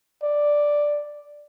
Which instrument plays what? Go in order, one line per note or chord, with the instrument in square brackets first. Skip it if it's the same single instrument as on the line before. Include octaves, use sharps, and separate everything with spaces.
[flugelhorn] D5